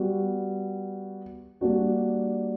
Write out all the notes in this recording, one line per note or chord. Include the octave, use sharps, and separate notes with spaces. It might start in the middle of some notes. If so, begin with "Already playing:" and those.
Already playing: G3 B3 F#4
G3 A#3 D4 F#4